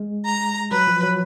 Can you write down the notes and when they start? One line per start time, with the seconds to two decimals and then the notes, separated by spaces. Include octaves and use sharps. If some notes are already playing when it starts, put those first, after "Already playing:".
Already playing: G#3
0.25 A#5
0.71 F#3 B4
0.87 F3
1.03 F#3